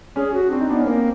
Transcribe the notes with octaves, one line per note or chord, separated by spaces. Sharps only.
C#4 G#4
F#4
C4 D4
D#4
B3 D4
C#4
A#3 C4